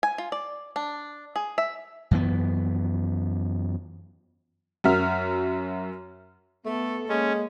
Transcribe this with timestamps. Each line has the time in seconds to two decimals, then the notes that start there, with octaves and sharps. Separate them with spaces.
0.03 G#5
0.18 F4
0.32 D5
0.76 D4
1.36 G#4
1.58 E5
2.11 F#2 E3 B3
4.84 F#2 F#4 A#4 E5 F6
6.65 A3 B3 A4
7.09 G#3 A#3 C#4